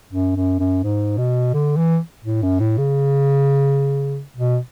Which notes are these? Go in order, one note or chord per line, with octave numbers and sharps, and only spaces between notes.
F#2
F#2
F#2
G#2
B2
D3
E3
A2
F#2
A2
C#3
B2